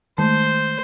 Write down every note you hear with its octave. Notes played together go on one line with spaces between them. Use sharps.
D#3 G#3 A3 C5